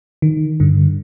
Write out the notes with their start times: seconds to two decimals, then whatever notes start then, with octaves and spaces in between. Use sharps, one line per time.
0.22 D#3
0.60 G2 D3